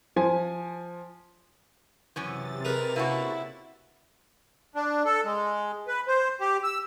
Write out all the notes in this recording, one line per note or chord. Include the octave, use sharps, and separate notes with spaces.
F3 G#5
F#2 C3 E3 C#4 A6
D#4 G#4 A#4 B4
A#3 C#4 E4 F#4
D4
A4
G#3
B4
C5
G4
E6